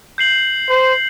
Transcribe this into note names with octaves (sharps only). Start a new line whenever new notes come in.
G6 C7 F#7
C5